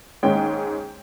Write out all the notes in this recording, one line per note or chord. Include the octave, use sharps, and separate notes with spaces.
G#2 D#3 G#3 C#4 G5